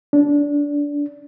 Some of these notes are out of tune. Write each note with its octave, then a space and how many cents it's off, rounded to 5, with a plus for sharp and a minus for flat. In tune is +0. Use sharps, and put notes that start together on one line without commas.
D4 -20